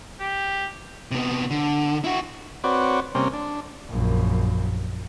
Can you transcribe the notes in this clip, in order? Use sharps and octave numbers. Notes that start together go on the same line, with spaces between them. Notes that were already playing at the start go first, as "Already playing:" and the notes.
G4
C3 B3
D3
E4 F#4
C4 F#4 B4 C#5 D5
C3 G3 A#3 C4 C#4
D4
A#1 F#2